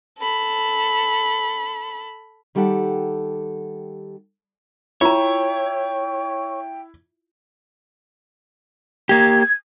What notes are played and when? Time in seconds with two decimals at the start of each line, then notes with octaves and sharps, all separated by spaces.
0.19 A4 B5
2.55 D#3 G3 G4 A4 F#5
5.01 E4 F4 C#5 G5 A#5
9.09 A#3 G4 G#6